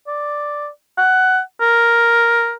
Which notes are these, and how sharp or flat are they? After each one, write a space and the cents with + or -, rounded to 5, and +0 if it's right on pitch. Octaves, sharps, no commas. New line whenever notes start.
D5 +0
F#5 +15
A#4 +5